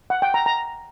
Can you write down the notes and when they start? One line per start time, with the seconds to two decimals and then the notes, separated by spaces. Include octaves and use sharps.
0.10 F#5
0.22 G5
0.34 A#5
0.46 A#5